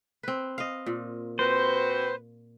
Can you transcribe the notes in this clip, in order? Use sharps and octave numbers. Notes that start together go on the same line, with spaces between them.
C4 B4
D#5 F5
A#2
C4 F#4 B4 C5